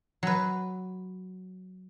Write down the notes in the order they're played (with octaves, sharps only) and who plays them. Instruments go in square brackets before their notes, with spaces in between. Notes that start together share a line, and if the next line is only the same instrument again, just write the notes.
[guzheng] F#3 B4